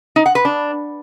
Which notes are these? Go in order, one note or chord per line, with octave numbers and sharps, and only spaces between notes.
D#4
F#5
B4
D4